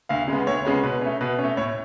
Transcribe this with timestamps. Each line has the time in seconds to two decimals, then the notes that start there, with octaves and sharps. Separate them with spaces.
0.09 D2 F5
0.28 C#3 G#3 B3
0.47 D2 C#5
0.65 C#3 G#3 B3
0.84 B2 B4
1.02 A3 C#4
1.21 B2 B4
1.39 C#4
1.44 A3
1.57 A2 C#5